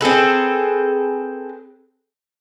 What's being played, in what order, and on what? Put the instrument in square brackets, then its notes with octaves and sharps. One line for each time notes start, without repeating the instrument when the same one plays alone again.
[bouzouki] C4 G#4 A4 B4